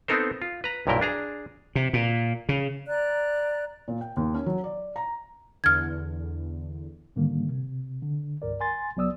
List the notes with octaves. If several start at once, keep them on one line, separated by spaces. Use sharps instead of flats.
B3 C4 D#4 A4 A#4 C5
F4
B4 A#5
B1 G2 A#2 E4 A#4 G5
D4 G#4 A#5
C3
A#2
C#3
D5 A#5 F#6
A#2
G5
D#2
C#4
F#3
D5
A#5
E2 D3 F6 G#6
G#2 D3 D#3 G3 A#3
C3
D3
C2 G2 A#4 D5
G#5 C6 A6
C2 F#3 B3 D5 D#6 E6